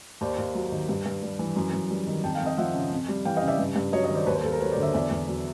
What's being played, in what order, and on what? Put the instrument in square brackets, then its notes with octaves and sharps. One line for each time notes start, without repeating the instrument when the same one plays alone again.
[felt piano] D#2 C5 D5
D#2
F#3
D#3
G2
G2
G3
E3
F#2
F#2
G3
D#3
F2 G5 A5
F5 G5
F2
D#5 F5
F3 E5 F#5
C#3
F2
G3
E3 F5 G5
D#5 F5
C#3
D5 E5
G2
G2
F#3 C#5 D#5
C#5 D#5
D#3
C5 D5
D#2 B4 C#5
A#4 C5
D#2 A4 B4
A#4 C5
F#3 B4 C#5
C5 D5
D3
D5 E5
E2 D5 E5
E2
F#3